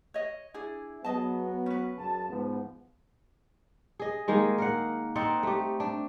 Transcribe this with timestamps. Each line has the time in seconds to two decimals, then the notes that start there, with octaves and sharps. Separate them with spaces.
0.14 C#5 D#5
0.54 D4 E4 G#4
1.05 F#3 B3 G#4 D#5 A5
1.66 C#4 B4
1.98 F#2 C#3 A5
2.30 G#2 F3 B3
3.99 G#4 D#5
4.28 D#3 G#3 A#3 D#4
4.58 A#4 F5 F#5
5.16 C4 D#4 D5 F#5
5.43 A3 G4
5.80 D4